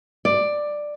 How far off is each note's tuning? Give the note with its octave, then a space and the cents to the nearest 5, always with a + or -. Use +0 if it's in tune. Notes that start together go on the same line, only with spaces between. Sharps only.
D5 +10